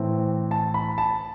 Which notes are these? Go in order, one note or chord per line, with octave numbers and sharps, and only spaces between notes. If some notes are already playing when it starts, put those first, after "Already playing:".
Already playing: A2 E3 A3 C4
A5
B5
A5